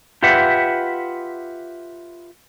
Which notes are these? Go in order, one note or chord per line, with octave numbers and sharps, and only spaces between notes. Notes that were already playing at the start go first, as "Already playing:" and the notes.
F4 G4 B4 E5 F#5